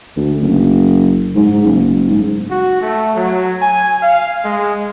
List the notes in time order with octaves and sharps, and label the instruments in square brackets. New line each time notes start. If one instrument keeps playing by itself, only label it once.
[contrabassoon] D2
F#1
G#2
F#1
G#2
[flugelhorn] F#4
A3
F#3
G#5
F5
G#3